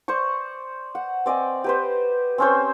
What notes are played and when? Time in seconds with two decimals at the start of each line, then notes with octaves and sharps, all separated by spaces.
0.08 C5 D5 C#6
0.95 F#5
1.26 C4 D5 D#5 G#5
1.64 G4 B4 C5
2.38 C4 C#4 C5